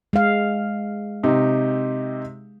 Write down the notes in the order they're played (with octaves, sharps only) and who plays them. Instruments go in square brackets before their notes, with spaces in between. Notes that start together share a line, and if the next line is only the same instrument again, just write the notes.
[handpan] G#3 F5
[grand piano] C3 D#4 G4